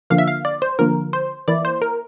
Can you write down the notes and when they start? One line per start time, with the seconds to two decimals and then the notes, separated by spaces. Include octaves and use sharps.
0.10 D3 F3 A#3 F5
0.18 E5
0.28 F5
0.45 D5
0.62 C5
0.79 D3 F3 A#3 A#4
1.13 C5
1.48 E3 A#3 E4 D5
1.65 C5
1.82 A#4